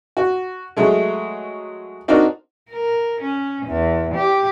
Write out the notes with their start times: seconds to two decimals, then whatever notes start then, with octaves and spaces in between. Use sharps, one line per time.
0.17 F#4
0.77 F#3 G#3 A3
2.08 C4 D4 D#4 F#4 A#4
2.71 A#4
3.21 C#4
3.67 E2
4.14 G4